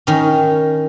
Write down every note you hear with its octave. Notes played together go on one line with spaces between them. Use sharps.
D#3 C#4